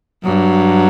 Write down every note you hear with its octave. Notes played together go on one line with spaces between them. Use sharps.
G2 F#3